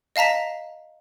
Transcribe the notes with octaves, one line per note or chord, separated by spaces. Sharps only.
D#5 F5 A5 A#5 B6